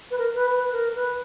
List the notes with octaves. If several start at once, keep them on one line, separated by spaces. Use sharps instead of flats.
B4
A#4
B4
B4
B4
A#4
B4